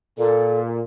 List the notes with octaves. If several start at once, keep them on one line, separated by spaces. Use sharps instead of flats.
A#2 A4